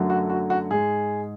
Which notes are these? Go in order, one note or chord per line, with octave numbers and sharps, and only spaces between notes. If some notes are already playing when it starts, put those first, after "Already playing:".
Already playing: F#2 D3 F#3 A3
F#4
F#4
F#4
G#2 G#3 G#4